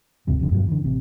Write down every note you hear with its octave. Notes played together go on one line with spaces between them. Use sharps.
G1 D2 C3 G3
F1 F2 D3
G2 B2 D3 F#3
D3 E3
A1 C3